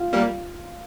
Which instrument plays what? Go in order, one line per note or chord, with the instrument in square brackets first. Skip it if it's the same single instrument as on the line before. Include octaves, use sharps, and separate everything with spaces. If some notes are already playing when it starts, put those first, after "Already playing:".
Already playing: [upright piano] F4
[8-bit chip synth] G3 A#3